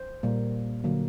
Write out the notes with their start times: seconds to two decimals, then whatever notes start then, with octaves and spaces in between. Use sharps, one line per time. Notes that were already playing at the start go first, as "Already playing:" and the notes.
Already playing: C5
0.23 A#2 G3 A#3
0.84 D3 F#3 A#3